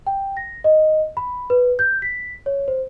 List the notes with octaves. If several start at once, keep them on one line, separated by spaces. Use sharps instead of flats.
G5
A#6
D#5
B5
B4
G6
B6
C#5
C5